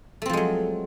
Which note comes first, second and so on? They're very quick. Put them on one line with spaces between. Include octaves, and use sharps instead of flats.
A3 C4 F3 G#3 F#3